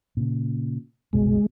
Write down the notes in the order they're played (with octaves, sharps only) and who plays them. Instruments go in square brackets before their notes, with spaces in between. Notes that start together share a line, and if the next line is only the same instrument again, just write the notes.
[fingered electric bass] A#2 C#3
[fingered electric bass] F#1 C2 B2 [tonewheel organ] G#3